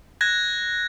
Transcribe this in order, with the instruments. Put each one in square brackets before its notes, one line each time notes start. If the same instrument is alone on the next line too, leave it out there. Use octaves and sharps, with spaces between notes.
[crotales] F#6 G#6 A#6